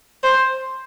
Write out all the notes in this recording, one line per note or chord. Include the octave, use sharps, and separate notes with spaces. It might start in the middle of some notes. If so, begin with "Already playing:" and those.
C5